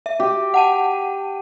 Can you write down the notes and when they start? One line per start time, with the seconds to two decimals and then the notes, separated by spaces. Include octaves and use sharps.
0.06 E5
0.20 G4
0.54 F#5 A5 D#7